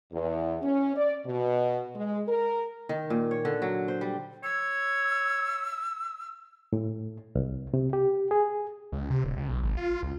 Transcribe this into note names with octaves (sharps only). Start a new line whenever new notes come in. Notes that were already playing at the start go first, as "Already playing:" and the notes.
E2
C#4
D5
B2
G#3
A#4
D#3
A#2
C#5
D3
F#3
C5
G3
C#5 E6
A2
C2
C3
G4
G#4
C#2
C3
D1
C#2
B1
G#1
F4
C#2